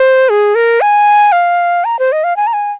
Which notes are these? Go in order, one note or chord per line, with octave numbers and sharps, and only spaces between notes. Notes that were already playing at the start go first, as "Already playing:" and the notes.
Already playing: C5
G#4
A#4
G#5
F5
A#5
C5
D#5
F5
G#5
A#5
G#5